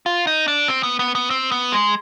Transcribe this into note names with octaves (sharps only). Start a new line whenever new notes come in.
F4
D#4
D4
C4
B3
B3
B3
C4
B3
G#3